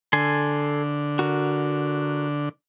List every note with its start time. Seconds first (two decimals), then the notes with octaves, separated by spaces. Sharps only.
0.13 D3 A4 G#5 C6
1.19 F#4 A#4